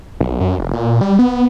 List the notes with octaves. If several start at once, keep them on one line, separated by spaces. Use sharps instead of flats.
B1
F#2
F1
A#2
G3
B3